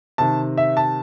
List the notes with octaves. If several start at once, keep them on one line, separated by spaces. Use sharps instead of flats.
C3 D#3 A5
E5
A5